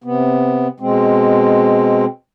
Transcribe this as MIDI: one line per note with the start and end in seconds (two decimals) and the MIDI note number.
0.04 0.67 48
0.04 0.67 59
0.80 2.05 47
0.80 2.05 56
0.80 2.05 60